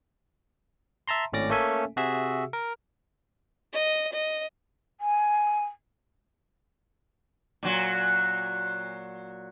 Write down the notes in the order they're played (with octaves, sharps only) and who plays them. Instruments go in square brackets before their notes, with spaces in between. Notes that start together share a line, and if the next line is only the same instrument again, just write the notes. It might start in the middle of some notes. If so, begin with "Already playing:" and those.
[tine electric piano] E5 A5 A#5 C6
G#1 A2 C#4 D5 D6 A#6
A3 A#3 C#4 A4 E5 G#5
C3 F#4 G#4 E5 E6
A#4
[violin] D#5
D#5
[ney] G#5
[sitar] A#2 F#3